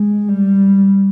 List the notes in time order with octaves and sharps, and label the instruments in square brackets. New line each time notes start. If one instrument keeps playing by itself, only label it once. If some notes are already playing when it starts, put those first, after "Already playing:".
Already playing: [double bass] G#3
G3